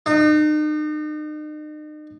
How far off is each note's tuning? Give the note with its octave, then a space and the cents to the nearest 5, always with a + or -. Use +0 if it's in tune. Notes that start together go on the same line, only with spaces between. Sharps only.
D#4 -40